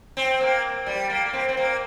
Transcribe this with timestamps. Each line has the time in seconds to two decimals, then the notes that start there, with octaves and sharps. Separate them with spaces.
0.17 C4
0.41 A#3
0.86 G3
1.10 A#3
1.26 A#3
1.33 C4
1.49 C4
1.57 A#3